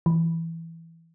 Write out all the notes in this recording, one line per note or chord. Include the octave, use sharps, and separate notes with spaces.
E3